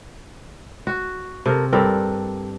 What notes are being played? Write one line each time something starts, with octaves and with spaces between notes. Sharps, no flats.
F#4
C3 A4 A#4
G2 C4 D4 A4 A#4 G5